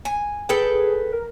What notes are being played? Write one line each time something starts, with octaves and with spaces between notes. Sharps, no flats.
G#5
G#4 A4 B4 G5
A#4